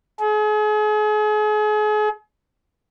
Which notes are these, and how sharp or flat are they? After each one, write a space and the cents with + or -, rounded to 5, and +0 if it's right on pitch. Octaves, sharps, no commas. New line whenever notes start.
G#4 +40